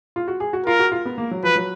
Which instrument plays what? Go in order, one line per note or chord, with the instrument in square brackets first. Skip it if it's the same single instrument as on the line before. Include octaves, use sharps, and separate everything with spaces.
[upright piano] F4
F#4
G#4
F#4
[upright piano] F4 [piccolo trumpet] A#4
[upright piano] F#4
F4
B3
A#3
F#3
[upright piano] F3 [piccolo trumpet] B4
[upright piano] F#3